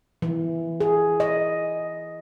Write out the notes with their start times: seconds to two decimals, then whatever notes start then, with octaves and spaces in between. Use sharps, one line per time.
0.22 E3
0.80 G#4
1.20 D#5